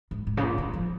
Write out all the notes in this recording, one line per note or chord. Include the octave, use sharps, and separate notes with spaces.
G#2
G#2
C#3
A#2
D#3
F3